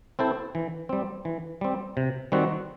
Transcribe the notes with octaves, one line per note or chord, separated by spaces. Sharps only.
C4 E4 A4 C5
E3
G3 C4
E3
G3 C4
C3
D#3 G3 C4 F#4